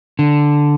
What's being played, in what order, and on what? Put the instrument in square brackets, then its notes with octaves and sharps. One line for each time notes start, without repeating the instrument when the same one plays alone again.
[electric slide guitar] D3